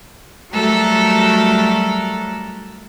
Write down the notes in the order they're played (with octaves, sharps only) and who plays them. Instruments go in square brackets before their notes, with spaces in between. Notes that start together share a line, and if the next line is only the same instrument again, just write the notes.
[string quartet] F#3 G3 A3 F#4 A4 A#4